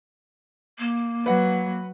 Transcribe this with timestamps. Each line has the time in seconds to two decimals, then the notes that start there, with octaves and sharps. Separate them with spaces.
0.78 A#3
1.26 F#3 B4 F#5